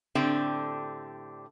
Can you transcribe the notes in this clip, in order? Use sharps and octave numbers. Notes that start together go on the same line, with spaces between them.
A2 D3 C4 D4 G4